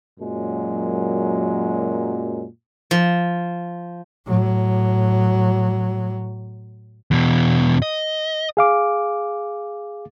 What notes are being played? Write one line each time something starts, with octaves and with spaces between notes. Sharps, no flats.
F#2 A#2 F#3 G#3
F3
A2 F#3
E2 B2
D#5
G#4 F5 D6